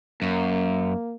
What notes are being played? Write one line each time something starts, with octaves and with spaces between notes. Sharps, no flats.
F#2 A#3